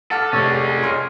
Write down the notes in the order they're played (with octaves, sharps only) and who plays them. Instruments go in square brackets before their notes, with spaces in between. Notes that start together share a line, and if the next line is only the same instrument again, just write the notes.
[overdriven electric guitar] A4 [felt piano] F#5 D6 F6
[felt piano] F1 [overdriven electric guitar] G#3 C#4
[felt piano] C6 F6